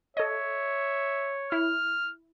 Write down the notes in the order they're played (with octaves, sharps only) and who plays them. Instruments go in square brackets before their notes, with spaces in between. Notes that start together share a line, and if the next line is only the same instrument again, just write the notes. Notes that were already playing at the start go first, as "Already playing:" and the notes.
[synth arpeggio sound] A4 D#5 [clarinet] C#5 [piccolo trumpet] E5
[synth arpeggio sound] E4 [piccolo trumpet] F6